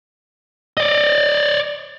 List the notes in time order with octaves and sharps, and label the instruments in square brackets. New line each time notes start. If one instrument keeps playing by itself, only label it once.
[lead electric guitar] D5 D#5